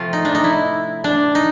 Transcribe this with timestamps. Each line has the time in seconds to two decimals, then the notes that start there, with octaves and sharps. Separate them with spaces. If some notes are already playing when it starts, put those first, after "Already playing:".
Already playing: C3 F3 A3 F4
0.13 D#4
0.25 D4
0.35 D#4
0.44 E4
1.04 D4
1.35 D#4